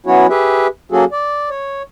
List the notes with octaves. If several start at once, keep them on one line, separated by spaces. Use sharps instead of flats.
F#3 B3 C#4 E4 F#4 C#5
G4 G#4 B4 E5
F#3 A#3 C#4 F#4 G#4 A4
D5
C#5